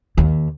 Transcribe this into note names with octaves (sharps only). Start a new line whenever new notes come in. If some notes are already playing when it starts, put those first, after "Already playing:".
D#2